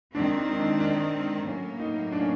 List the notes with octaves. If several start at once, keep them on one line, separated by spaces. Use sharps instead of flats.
D#3 G#3 C4 D4
D#4
D4
D#4
D4
D4
A2 F#3 A#3 C#4
D#4
D4
C#4